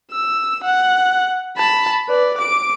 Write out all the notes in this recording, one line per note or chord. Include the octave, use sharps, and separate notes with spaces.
E6
F#5
A5 B5
B4 D5
D6 D7